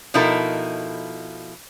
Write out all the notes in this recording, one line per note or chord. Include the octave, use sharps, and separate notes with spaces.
B2 F3 D#4 E4 A4 A#4